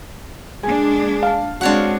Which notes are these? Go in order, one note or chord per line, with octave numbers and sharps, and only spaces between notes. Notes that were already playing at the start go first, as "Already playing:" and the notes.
G#3 A#3 D4 G#4 G#5
F5 A5
G#3 C4 D4 F#4 C#5 F#5